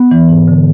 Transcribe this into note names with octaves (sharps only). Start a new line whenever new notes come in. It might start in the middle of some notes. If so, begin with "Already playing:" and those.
Already playing: B3
E3
G#2
D3